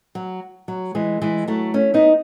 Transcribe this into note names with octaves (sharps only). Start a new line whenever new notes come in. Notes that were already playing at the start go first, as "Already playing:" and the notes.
F#3
F#3
E3 G#3
E3 G#3
F#3 A3
A3 C#4
B3 D#4